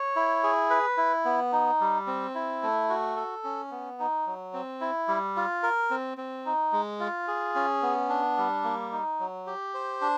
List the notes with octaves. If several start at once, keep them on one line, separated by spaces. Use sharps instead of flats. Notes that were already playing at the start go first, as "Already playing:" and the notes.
Already playing: C#5
E4
G#4
B4
E4
B3
D#4
G3
C4
E4
A3
F#4
A4
C#4
B3
D#4
F#3
C4
E4
G3
F4
A#4
C4
C4
D#4
G#3
F4
G#4
C#4
B3
D4
G3
A#3
D#4
F#3
G4
C5
D4